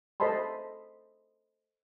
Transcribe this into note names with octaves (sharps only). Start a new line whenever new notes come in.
A4 C5 D#5 A5 B5 C6